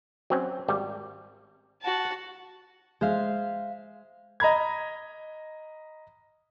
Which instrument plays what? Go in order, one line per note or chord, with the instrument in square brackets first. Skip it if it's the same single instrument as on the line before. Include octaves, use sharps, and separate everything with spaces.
[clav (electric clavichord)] F#3 C4 C#4
G#1 G3
[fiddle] F#4 A5
[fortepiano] G#3 [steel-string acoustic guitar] C5 E5 F5
[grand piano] D#5 A#5 B5 G#6